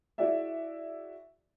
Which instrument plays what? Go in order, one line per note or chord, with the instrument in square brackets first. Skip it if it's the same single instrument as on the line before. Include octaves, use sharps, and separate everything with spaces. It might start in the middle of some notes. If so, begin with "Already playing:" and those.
[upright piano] E4 F#4 G#4 D5 E5